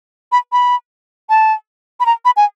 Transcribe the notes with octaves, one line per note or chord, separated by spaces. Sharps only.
B5
B5
A5
B5
A#5
B5
G#5